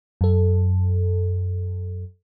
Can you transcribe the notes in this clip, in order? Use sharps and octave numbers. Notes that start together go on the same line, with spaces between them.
F#2 A4